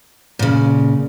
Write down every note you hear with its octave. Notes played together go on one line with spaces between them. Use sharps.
A#2 C#3